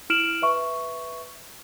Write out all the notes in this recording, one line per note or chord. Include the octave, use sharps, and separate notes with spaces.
E4 F6 D7 E7 F#7
B4 E5 C#6